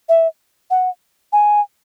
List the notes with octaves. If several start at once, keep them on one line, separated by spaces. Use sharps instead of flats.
E5
F#5
G#5